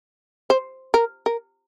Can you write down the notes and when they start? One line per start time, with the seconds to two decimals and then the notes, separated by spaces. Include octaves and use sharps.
0.50 C5
0.94 A#4
1.26 A#4